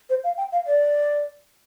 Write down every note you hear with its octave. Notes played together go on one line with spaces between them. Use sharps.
C5
F5
G5
F5
D5